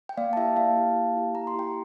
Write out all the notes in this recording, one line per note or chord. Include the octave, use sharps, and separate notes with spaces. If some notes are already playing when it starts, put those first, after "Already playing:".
G5
A#3 D5 F5
A5
E4 G4 E5 G5
A#3 F5 A5
E4 G4
A#3
E4 G4
A#3 A#5
C6
E4 G4 G5 A#5